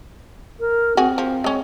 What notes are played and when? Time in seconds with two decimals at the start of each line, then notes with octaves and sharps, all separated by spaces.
0.60 A#4
0.97 C4 F#4 G#4
1.18 F3
1.44 G#3 C#4